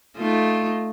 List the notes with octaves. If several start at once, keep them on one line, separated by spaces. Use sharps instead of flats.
A3 D#4 F4